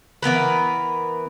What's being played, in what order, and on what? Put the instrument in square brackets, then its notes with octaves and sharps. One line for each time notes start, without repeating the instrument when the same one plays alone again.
[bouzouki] E3 B3 A#4 B4